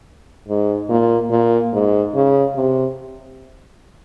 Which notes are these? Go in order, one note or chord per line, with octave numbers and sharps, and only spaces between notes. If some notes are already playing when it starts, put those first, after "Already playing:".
G#2
A#2
A#2
G#2
C#3
C3